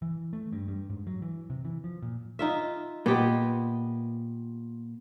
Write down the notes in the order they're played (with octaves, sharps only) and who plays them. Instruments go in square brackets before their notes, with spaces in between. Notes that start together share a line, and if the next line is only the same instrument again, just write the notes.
[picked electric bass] E3
A3
G2
G2
G#2
F#3
E3
C3
E3
F3
A#2
[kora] D#4 F4 E5
[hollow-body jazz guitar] A#2 [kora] B3 G4 D#5